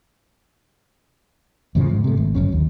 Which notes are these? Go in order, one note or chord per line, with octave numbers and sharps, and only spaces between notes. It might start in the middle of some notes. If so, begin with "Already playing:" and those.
F2 A2 C#3 F3
G#2
C3 A3
G#1
F#1 F#2 C#4
D#2